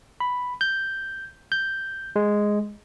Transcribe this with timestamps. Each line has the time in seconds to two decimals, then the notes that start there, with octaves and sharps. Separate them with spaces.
0.20 B5
0.61 G6
1.52 G6
2.16 G#3